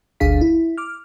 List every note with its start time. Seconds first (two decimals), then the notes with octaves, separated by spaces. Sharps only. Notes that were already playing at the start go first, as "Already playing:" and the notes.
0.20 G1 D2 D4 G#4 F5 B6
0.41 E4
0.78 D6 F6